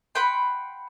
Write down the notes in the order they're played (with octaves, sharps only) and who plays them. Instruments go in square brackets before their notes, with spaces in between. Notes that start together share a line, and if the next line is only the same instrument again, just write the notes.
[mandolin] B4 F#5 G5 C6